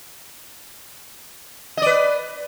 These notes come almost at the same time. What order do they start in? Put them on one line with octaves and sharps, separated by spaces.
D#5 D5 B4